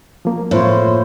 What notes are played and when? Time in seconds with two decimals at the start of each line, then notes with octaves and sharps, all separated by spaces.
0.25 F3 A#3
0.51 A2 F4 C5 C#5